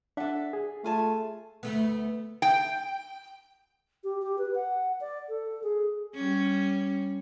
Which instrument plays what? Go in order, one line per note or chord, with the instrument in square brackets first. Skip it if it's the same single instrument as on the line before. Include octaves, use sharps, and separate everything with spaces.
[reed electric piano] D4 F#5 [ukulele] A4 E5
[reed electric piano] G#4
[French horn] A3 [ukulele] F4 G#5 A5
[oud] D2 A3 B3
[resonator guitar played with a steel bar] G5
[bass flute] G4
G4
B4
F#5
D5
A4
G#4
[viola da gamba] G3 C#4